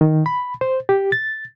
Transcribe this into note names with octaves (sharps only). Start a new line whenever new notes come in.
D#3
B5
C5
G4
A6